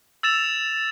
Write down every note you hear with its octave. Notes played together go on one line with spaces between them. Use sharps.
E6 A6 E7 F7